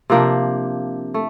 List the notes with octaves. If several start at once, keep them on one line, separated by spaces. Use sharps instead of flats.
C3 F3 A#3 D4
A3